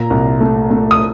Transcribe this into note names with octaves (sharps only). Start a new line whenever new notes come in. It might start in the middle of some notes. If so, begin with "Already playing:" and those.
Already playing: A#2 A#5
C2
A3
A3
D#6